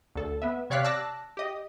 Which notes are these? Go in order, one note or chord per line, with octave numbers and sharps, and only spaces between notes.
D2 A4
B3 E5
C3 C#5 D5 F5 F#6 B6
A5 D6 E6 F#6 A#6
G4 D#5